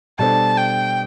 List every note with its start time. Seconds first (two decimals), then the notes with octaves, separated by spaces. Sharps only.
0.19 B2 G3 D4 A4 C5 A5
0.57 G5